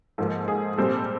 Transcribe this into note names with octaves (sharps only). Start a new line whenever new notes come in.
G#2 F3 A#3 A4
G#4
A#2 G3 C4 A4